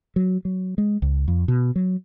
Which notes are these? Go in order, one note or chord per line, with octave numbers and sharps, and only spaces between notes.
F#3
F#3
G#3
C#2
F2
B2
F#3